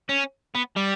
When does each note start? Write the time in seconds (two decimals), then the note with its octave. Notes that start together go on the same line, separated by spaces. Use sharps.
0.09 C#4
0.55 B3
0.77 G3